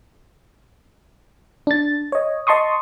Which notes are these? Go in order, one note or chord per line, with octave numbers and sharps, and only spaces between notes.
D4 A6
C#5 D#5
D#5 A5 C6 C#6 D#6